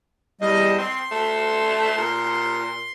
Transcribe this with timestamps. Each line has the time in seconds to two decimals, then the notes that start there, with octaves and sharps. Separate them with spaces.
0.41 E2 G3 D#5
0.78 C4 C6
1.11 A3
1.97 A#2